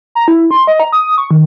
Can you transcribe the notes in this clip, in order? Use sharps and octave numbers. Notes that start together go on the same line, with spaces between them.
A#5
E4
C6
D#5
A#5
D#6
C#6
D#3